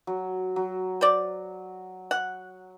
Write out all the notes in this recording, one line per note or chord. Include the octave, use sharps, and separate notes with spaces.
F#3
F#3
C5 D5
F#5